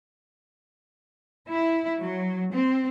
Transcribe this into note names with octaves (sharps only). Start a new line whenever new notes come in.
E4
F#3
C4